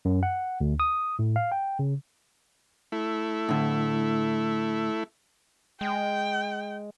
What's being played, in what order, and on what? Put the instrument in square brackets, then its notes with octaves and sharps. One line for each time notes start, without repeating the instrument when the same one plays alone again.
[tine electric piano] F#2
F#5
D2
D#6
A2
F5
G5
C#3
[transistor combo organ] A3 E4
[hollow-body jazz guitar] A2 D3
[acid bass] G#3 [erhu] G5